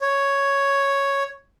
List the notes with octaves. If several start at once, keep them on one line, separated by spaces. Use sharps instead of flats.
C#5